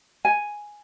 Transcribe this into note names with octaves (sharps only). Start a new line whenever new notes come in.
G#5